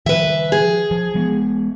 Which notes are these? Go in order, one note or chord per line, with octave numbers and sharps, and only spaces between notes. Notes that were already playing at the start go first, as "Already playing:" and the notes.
D#3 F3 B4 E5
G#4
F3
G#3 B3